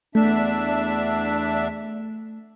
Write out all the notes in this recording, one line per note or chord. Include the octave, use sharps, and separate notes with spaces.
E2 A3 D4 E5